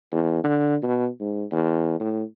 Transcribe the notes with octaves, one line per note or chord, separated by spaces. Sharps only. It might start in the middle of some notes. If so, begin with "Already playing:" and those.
E2
D3
B2
G#2
E2
A2